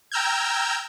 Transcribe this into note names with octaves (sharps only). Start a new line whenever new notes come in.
G5 A#5 E6 F6 G6 G#6